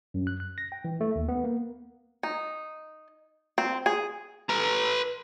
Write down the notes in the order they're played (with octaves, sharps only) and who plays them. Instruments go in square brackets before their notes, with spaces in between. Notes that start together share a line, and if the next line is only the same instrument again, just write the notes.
[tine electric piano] F#2
F#6
F#6
A#6
G5
E3
A3
D#2
B3
A#3
[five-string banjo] D#4
C4
G#4
[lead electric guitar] B4 A#5